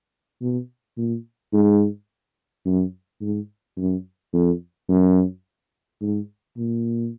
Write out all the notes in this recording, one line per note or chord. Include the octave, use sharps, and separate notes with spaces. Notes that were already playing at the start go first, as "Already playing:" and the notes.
B2
A#2
G#2
F#2
G#2
F#2
F2
F#2
G#2
A#2